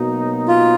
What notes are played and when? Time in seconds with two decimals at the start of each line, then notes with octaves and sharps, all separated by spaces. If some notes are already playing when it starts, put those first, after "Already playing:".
Already playing: B2 F#3 A#3 D#4
0.48 F4